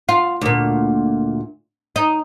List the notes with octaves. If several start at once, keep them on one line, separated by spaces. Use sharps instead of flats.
F4
D2 A#2
D#4